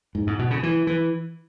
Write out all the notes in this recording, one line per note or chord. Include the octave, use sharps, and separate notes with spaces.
G#2
G#2
B2
C#3
E3
E3